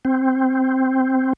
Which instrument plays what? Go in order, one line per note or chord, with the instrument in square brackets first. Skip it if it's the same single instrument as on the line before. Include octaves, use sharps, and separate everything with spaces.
[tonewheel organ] C4